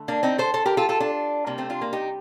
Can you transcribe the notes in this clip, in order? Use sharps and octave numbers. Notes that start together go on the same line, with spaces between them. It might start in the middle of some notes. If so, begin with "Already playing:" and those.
Already playing: D3 A3
A#3 D4
C4 D#4
A4 C5
A4 C5
G4 A#4
F4 A4
F4 A4
D4 F4
C3 G3 A#3
A3 C4
D4 F4
A#3
D#4 G4